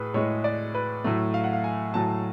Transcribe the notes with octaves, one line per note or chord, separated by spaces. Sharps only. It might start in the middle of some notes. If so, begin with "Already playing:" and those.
Already playing: A2 G#4 B4
A2 G#3 C#5
D5
B4
A2 F#3 A3
F5
F#5
F5
G#5
A2 F#3 A3 A5